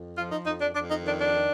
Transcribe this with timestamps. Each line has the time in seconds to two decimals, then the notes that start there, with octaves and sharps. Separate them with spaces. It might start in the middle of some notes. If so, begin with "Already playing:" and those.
Already playing: F2
0.15 F3 F4
0.31 D#4
0.45 F2 D#4
0.60 D4
0.75 F2 D4
0.90 D#4
1.04 D#3 D4
1.19 D4
1.34 D#3